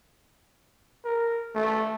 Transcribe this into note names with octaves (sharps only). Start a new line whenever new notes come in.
A#4
A3